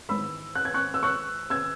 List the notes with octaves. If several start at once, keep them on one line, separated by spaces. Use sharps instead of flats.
G#1 G#2 E3 B5 E6
F#6
G#6
C#6 F#6
E6
C#6 F#6
E6 G#6